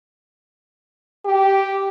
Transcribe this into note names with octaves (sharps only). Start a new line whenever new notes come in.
G4